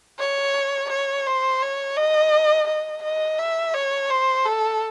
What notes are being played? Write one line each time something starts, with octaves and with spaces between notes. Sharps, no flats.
C#5
C#5
C5
C#5
D#5
D#5
D#5
E5
C#5
C5
A4